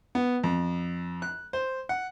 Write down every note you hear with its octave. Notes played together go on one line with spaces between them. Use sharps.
B3
F2
F#6
C5
F#5